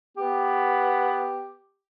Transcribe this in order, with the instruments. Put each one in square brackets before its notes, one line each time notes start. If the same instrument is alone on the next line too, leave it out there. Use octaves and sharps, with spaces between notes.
[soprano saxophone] B3 [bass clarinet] G4